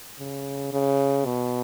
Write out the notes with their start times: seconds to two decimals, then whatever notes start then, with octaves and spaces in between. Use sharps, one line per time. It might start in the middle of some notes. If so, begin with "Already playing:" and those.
0.19 C#3
0.73 C#3
1.25 B2